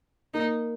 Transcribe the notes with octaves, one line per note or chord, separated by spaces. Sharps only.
A#3 D#4